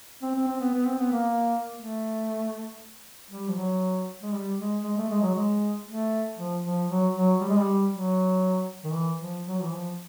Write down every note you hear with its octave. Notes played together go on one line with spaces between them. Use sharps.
C4
C4
C4
B3
B3
C4
B3
A#3
A3
G3
F3
F#3
G#3
G3
G#3
G#3
A3
G#3
F#3
G#3
A3
F3
F3
F#3
F#3
G3
G#3
G3
F#3
D#3
E3
F3
F#3
E3
F3